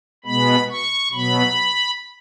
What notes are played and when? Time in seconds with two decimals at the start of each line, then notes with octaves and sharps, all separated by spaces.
0.25 B2 G#3 B3 B5
0.69 C#6
1.12 B2 F#3 B3 B5